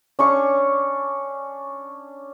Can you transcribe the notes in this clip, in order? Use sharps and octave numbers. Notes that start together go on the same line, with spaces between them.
C#4 D4 C#6